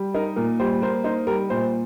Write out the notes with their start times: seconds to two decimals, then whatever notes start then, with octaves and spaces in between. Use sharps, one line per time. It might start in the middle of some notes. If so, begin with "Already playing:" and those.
Already playing: G3
0.14 D#4 A#4
0.36 A#2 A#4
0.59 G3 C5
0.82 A#3 C5
1.04 D#4 C5
1.27 G3 A#4
1.50 A#2 C5